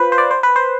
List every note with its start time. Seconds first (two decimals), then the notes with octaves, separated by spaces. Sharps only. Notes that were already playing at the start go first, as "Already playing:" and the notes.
Already playing: F4 B4 C5
0.12 C5
0.18 D5
0.31 C5
0.43 B4
0.56 C5